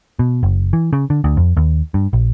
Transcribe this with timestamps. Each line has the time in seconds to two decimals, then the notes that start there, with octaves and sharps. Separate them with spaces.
0.19 B2
0.43 F#1
0.73 E3
0.93 C#3
1.10 D3
1.24 D2
1.37 F2
1.57 D#2
1.94 G2
2.13 A#1